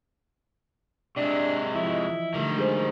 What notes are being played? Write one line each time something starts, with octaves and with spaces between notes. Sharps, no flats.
C3 G#3 D4
F3 E4 D#5
E3
D3 D#3 G3 A3
G#3 G#4 C5